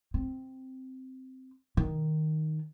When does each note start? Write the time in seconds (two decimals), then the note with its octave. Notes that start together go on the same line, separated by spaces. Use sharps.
0.14 C4
1.77 D#3